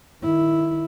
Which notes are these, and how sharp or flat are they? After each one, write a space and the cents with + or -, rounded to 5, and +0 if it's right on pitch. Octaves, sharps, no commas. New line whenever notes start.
D#3 -15 E4 +0